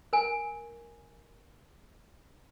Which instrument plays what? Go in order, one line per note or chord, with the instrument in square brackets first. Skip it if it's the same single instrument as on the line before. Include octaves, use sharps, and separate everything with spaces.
[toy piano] A#4 G#5